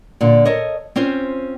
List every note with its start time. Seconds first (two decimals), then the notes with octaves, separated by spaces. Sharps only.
0.21 A#2 D3 F4
0.45 A4 A#4 C#5 D#5
0.96 C4 C#4 F4 C5